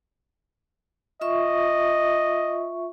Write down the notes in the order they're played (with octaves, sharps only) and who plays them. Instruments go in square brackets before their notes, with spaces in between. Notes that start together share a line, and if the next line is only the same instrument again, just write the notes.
[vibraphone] F4 E5 C#6 [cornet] D#5